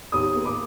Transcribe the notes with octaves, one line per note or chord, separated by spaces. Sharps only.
D#2 D#6
A#3
D6